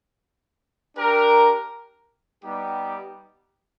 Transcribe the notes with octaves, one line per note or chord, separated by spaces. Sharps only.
D4 G4 A#4
G3 B3 D#4 G4